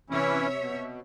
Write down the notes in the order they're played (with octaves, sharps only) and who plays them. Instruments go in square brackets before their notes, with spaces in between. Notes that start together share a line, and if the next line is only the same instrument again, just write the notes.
[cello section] C3 C#5 E5 [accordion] E3 C#4 E4
[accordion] B2